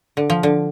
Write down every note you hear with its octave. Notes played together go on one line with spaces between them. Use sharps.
D3
F3
D3